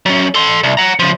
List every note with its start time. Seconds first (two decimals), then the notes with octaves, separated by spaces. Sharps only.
0.06 F#3 C#4
0.34 A4 C6
0.63 C2
0.77 F#5 A#5
0.99 C#3 F3